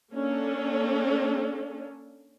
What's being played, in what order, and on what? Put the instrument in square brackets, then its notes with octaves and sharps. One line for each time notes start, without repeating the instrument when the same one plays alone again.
[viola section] A#3 C#4 D4 A4